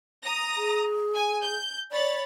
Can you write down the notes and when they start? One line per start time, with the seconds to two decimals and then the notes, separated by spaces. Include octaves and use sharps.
0.24 A#5 D#6 A#6
0.57 G#4
1.15 G#5
1.43 G6
1.92 C#5 D5 B5 A6